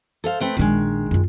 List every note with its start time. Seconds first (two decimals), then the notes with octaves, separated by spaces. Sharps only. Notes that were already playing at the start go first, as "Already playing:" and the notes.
0.24 A4 C5 F5
0.40 A3 C4 B4
0.57 A#1 D#3 G#3 D4
1.11 F#2 F4